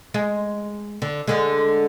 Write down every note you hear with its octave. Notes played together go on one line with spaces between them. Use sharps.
G#3
D3
D3 G#3